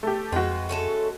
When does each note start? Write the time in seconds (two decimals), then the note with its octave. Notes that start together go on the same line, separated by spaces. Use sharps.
0.03 A3 G4
0.32 F2 G#3 F4 F#4 B4 G5
0.69 A3 C#4 A4